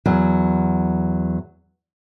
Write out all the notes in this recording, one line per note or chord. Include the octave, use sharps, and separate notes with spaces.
E2 F#3